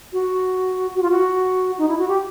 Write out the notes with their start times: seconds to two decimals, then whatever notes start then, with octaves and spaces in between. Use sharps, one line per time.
0.13 F#4
0.96 F#4
1.03 F4
1.10 F#4
1.78 D#4
1.88 E4
1.98 F#4
2.08 G4